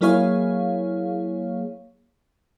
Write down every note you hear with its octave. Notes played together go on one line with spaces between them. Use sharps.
F#3 A#3 E4 G#4 C#5 F5